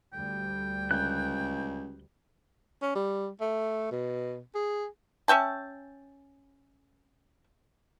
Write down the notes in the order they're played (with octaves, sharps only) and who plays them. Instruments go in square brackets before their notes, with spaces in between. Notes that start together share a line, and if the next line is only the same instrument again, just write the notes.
[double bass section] D2 G3 [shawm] G5
[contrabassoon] C#2 [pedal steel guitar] F#6 G6
[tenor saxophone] C#4
G3
A3
B2
G#4
[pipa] C#4 E5 G5 A5